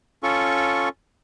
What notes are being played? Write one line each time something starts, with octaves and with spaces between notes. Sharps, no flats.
C#4 F4 A4 C#6